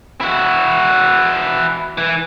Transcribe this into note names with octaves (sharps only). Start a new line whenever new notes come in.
E4 F#4
E3